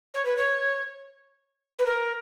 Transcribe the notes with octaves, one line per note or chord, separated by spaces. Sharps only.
C#5
B4
C#5
B4
A#4